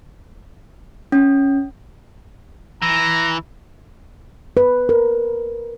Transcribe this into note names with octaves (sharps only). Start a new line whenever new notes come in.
C#4
E3 A#5
B4
A#4